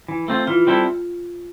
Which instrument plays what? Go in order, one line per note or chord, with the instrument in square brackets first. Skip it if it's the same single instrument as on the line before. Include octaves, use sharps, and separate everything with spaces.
[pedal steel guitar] E3
A3 C4 F4
[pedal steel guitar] E3 [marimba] F4
[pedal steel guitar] G3 C4 E4 A4